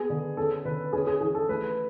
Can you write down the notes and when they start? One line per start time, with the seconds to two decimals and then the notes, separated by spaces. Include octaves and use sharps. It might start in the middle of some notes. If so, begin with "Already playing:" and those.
Already playing: B3 G#4
0.10 D3
0.37 C#4 A4
0.65 D3 B4
0.93 C#4 G#4
1.07 G#4
1.21 E3 G#4
1.35 A4
1.48 A3 B4